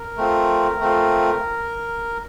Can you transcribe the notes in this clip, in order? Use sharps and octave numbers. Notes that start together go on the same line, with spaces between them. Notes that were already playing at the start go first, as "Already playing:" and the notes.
Already playing: A#4
A3 C4 F4
A3 C4 F4